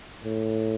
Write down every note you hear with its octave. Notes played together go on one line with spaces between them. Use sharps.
A2